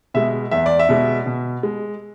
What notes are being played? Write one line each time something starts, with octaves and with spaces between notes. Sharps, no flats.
B2 G#3 E5
E2 E5
D5
E5
B2 G#3
B2
G#3